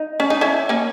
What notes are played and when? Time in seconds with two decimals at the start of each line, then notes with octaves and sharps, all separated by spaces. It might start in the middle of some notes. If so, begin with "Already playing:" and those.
Already playing: D#4
0.20 C#4
0.30 D#4
0.41 C#4 E4
0.69 A#3 C#4